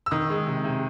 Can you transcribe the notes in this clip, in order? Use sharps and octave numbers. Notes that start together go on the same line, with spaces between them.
E6
D#3 D#6
G#3
C3
C3